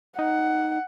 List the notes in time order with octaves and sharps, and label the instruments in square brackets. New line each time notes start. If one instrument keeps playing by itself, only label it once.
[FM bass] D#4 [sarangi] F#5